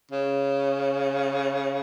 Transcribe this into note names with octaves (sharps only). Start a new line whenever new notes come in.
C#3